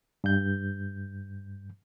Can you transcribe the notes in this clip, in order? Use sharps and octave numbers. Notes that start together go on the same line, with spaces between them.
G2 G6